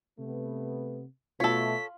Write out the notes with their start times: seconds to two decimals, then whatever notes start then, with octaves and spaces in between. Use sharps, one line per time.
0.19 C3 A3 B3
1.40 B2 A3 F4 A4 C#5 B5 B6